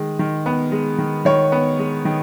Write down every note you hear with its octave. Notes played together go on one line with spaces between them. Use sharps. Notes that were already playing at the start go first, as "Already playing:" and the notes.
Already playing: D#3 G#3
D#3
B3
G#3
D#3
D#3 C#5
B3
G#3
D#3